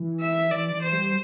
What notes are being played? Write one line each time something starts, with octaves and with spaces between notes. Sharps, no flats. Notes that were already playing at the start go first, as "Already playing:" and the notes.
Already playing: E3
E5
E3 D5
E3
C5
G3